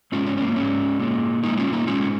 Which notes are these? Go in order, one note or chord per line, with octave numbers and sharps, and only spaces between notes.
G#2 G#3 C#4 F4
C#4
C#4
A#3
G#2 G#3 C#4
A#2 G#3
A#2 G#3 A#3 D#4
C#4 F4
A#3 D#4
G#2 D#3 G#3 C#4 F4